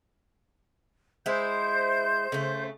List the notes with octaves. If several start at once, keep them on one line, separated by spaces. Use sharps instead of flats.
G#3 E4 C5 G6
C#3 A3